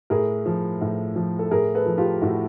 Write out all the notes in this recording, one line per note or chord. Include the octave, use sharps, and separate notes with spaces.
A2 G#4 A#4
F3
A2
F3
A4
A2 G#4 A#4
A4 B4
F3
F4 G4
A2 E4 F#4